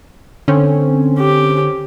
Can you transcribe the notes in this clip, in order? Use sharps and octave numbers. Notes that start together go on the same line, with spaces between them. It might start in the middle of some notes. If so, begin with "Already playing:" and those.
D3 C4 C#4
G4